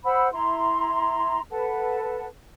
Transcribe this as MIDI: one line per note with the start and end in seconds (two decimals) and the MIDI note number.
0.04 0.28 72
0.04 0.28 78
0.04 0.28 83
0.04 0.28 88
0.32 1.41 64
0.32 1.41 82
0.32 1.41 84
1.51 2.26 69
1.51 2.26 71
1.51 2.26 78
1.51 2.26 81